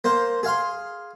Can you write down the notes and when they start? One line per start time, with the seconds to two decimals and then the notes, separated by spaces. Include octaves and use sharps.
0.04 A#3 C5
0.43 G#4 F5 C6